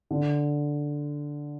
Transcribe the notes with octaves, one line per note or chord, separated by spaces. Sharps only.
D3